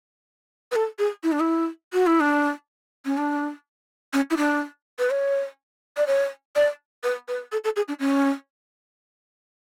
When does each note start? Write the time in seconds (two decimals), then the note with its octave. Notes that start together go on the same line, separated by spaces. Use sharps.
0.71 B4
0.75 A4
0.98 G#4
1.23 E4
1.32 D4
1.40 E4
1.93 F#4
2.06 E4
2.20 D4
3.05 C#4
3.17 D4
4.13 C#4
4.30 E4
4.37 D4
4.99 B4
5.10 C#5
5.97 D5
6.06 C#5
6.55 D5
7.03 B4
7.28 B4
7.52 A4
7.64 A4
7.76 G#4
7.88 D4
8.00 C#4